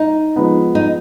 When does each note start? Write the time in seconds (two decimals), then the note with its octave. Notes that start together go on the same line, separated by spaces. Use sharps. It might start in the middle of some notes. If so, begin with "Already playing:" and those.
Already playing: D#4
0.36 F3 G#3 B3
0.75 D#4